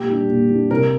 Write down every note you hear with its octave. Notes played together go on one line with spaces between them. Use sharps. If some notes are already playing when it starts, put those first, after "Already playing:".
Already playing: A#2 G4
G3 D4
A#2
G3 D4
C3 A#4